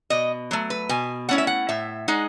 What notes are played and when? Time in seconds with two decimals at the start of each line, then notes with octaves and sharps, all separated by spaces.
0.10 B2 D#5
0.51 F#3 A3
0.70 B4
0.89 B2 G#5
1.29 A3 C#4 E4 F#5
1.38 E5
1.47 F#5
1.69 A2 E5
2.08 G#3 D#4 F#5